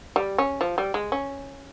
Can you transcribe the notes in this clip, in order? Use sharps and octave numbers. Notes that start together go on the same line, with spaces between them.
G3
C#4
F3
G3
G#3
C#4